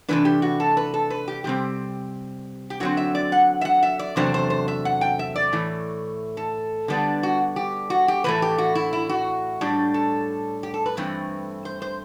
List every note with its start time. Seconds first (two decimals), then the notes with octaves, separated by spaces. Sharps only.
0.08 C3 E3 A3 D4 B4
0.25 G4
0.42 F#4
0.60 A4
0.77 B4
0.94 A4
1.10 B4
1.28 G4
1.44 C3 G3 C4 G4
2.70 G4
2.80 D3 F#3 C4 F#4
2.97 E5
3.15 D5
3.32 F#5
3.61 E5
3.65 F#5
3.83 E5
3.99 D5
4.16 E2 C3 F#3 A3 D4 C5
4.34 C5
4.50 C5
4.68 E5
4.85 F#5
5.01 G5
5.19 E5
5.36 D5
5.53 A2 E3 A3
6.37 A4
6.88 D3 G3 B3 D4
7.23 F#4
7.56 G4
7.90 F#4
8.08 G4
8.24 A2 E3 A3 B4
8.42 G4
8.58 F#4
8.75 E4
8.93 E4
9.09 F#4
9.61 A2 G3 D4
9.94 A4
10.63 G4
10.74 A4
10.86 B4
10.97 G2 E3 A3 C4
11.65 C5
11.82 C5